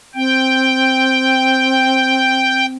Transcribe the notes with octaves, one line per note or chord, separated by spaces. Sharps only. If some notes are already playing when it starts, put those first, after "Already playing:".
C4 G5